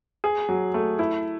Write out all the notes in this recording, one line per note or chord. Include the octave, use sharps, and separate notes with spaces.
G#4
F#3
A3
E4